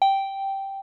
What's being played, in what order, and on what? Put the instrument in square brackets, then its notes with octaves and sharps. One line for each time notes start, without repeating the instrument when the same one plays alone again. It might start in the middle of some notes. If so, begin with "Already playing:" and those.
[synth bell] G5